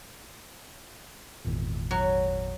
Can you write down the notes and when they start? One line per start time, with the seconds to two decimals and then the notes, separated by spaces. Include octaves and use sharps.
1.45 G#1 E2 A#2
1.91 F#3